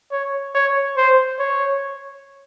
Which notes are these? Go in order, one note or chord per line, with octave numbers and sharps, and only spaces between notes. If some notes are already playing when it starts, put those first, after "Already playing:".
C#5
C#5
C5
C#5